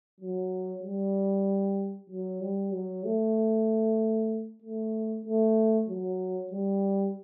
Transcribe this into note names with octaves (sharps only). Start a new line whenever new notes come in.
F#3
G3
F#3
G3
F#3
A3
A3
A3
F#3
G3